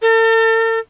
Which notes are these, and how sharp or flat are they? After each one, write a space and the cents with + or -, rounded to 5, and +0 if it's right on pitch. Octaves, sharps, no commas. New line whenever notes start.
A4 +45